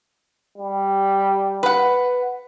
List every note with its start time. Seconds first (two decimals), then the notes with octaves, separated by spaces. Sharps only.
0.58 G3
1.63 B4 F#5